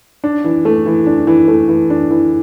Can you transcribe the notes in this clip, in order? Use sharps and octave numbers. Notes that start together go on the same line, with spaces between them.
D4
E3
A3
E3
D4
E3
A3
E3
D4
E3